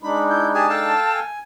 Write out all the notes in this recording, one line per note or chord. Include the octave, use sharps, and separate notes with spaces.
G#3 D4 D#4 B5
E4 G6
G4 G#4 G#5 A5
A4 F5 G5
G#5